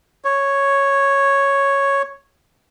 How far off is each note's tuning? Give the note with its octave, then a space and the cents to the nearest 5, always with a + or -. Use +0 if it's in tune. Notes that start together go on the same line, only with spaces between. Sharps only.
C#5 +0